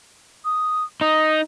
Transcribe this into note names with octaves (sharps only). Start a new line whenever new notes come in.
D#6
D#4 D#6